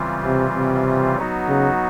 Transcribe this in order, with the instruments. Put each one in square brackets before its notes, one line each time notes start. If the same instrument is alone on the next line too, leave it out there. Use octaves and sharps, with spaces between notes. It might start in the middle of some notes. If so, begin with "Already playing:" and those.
Already playing: [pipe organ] C#3 E3 G3 C4 F4
[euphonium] C3
C3
[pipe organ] F#3 B3 D#4 F#4
[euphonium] C#3